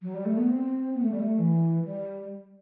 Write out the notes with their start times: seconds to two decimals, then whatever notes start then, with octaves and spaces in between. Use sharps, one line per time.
0.02 F#3
0.14 G3
0.25 A3
0.37 B3
0.50 C4
0.95 B3
1.02 A3
1.12 G3
1.20 A3
1.39 E3
1.85 G3